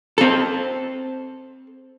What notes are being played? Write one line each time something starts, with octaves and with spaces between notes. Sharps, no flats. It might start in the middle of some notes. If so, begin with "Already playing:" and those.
C4 A4